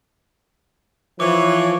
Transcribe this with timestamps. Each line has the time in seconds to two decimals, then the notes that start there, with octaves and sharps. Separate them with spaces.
1.20 E3 F3 C#5 D6